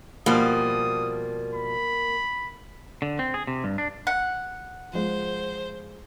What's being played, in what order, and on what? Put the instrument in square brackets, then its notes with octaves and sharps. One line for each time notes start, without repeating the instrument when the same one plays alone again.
[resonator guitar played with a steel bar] B2 F3 G3 [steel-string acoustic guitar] A#3 [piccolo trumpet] D#6
[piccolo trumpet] B5
[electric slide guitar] D3
C4
G#4
C3
G2
D4
[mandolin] F#5
[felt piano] F3 G#3 [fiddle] C5